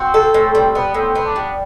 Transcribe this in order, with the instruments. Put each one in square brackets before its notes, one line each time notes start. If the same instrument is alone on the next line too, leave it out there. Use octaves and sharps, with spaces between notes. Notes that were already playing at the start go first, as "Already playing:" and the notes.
Already playing: [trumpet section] C4 [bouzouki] F#4
[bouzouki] A4
A2
G3
B3
[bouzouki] A2 [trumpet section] C4
[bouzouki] B3
[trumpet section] D4
[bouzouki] G3